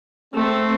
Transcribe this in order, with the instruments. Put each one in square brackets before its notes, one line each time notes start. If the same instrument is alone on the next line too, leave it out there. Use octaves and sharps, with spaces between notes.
[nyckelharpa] A3 [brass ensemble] C4